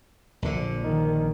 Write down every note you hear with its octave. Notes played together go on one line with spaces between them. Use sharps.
A#1 D3
D#3